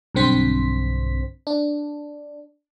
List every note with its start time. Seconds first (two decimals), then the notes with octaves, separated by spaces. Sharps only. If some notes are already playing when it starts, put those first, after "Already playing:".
0.15 B1 G2 D3 C4 C5 B6
1.47 D4